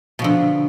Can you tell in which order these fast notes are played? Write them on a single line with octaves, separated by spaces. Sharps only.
B2 F3 D3